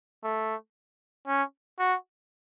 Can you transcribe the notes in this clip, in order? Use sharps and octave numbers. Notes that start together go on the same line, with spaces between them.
A3
C#4
F#4